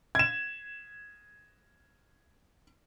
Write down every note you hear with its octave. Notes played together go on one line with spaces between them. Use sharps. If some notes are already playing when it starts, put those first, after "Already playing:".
G#6 E7